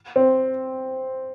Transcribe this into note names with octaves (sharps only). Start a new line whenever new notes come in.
C4